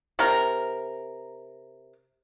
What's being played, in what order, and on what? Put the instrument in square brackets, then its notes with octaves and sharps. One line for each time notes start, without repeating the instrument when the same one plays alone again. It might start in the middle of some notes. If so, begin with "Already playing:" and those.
[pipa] C3 A#4